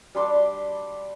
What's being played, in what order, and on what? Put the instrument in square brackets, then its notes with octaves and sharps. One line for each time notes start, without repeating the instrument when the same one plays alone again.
[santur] G3 D4 C6 D6